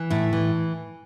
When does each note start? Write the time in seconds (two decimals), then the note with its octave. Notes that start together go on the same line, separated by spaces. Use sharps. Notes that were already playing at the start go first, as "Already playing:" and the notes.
Already playing: E3
0.10 A2 E4
0.33 E3